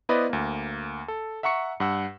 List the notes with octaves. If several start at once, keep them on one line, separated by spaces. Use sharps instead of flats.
B3 E4 B4 C5 D5 D#5
D2 A#3
A4
E5 F#5 A#5 C#6 C#7
G2 F#5 E6